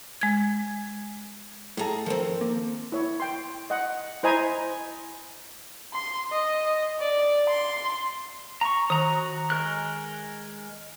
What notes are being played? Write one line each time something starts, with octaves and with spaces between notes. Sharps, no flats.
G#3 G#6
A2 G#4 A4 A5 A#5
D#3 F3 C4 A4 C5
A#3
E4 C#5
G5 C6
D#5 F#5
E4 C5 D#5 G#5 A#5 B5
C6
D#5
D5
C6
A#5 C#6
D#3 F#4 A#5 D#6
G#3 A#4 F#6